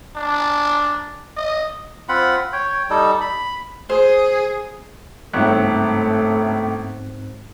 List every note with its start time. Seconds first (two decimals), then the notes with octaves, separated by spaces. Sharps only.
0.17 D4
1.37 D#5
2.09 C4 F4 F#5 B5
2.53 C#5 G5
2.90 G3 D#4 A4
3.21 B5
3.89 G#4 C5
5.34 G1 C#2 G#2 A3 C4 F#6